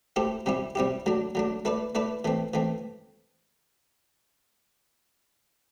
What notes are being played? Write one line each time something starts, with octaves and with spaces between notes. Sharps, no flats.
A3 E4 G4 C5
C3 G3 C4 E4 G4
C3 G3 C4 E4 G4
F#3 A3 D4
F#3 A3 D4
A3 E4 B4 D5
A3 E4 B4 D5
E3 A3 C4
E3 A3 C4